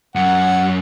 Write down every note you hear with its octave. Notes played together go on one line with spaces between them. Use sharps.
F#2 F#5